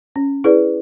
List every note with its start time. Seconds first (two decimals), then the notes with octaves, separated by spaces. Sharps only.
0.16 C#4
0.44 E4 G#4 B4 D5